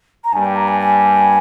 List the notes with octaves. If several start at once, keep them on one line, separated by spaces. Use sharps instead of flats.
A#5
G2 G3 A#3 G#5
G5
A#5
G#5
G#5